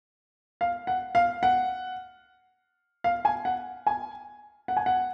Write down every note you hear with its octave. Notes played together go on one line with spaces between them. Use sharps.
F5
F#5
F5
F#5
F5
G#5
F#5
G#5
F#5
G#5
F#5